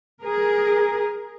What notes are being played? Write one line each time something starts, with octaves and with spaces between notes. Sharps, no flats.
G#4 A#4